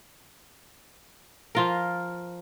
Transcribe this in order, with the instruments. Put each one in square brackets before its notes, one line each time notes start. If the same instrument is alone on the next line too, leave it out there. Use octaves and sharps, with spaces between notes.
[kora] F3 F4 A#4